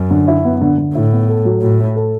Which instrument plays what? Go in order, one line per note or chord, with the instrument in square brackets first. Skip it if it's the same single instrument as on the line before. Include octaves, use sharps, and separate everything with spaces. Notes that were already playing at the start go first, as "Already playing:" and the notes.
Already playing: [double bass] F#2
[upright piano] D3
E4
B3
D3
D3
[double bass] A2 [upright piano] E4
[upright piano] B3
A4
F#3
[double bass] A2 [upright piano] F#4
[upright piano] A3
A4